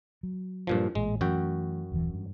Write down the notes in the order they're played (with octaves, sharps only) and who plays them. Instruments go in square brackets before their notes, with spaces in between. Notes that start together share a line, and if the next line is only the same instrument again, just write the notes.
[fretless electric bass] F#3
[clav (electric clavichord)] G2 A#2 F3
[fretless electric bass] A1 A#2 [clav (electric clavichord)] G#3
[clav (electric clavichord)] F#2 F#4 G5 [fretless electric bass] E3 A3
[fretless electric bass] D#1 E3
G2